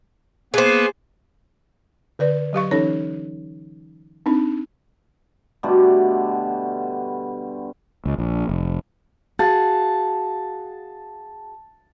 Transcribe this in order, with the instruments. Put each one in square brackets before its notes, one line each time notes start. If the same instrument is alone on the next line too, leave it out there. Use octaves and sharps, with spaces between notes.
[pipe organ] A#3 B3 B4 [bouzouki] G#4 C5
[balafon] D3 B4 D5
F#3 G4 F5 C#6
E3 C#4 D#4 A4 C#5
C4 D4 D#4
[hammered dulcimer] B2 D3 G3 A3
[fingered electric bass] C#2
A#1
F1
[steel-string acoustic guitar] F#4 G#4 F5 [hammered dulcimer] A5